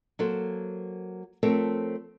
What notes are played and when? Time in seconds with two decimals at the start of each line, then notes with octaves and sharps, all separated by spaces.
0.19 F#3 A#3 A4 C5
1.43 F3 A3 C4 A4 A#4 C#5